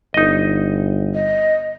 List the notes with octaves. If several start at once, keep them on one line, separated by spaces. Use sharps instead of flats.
G1 D#4 D#5
D#5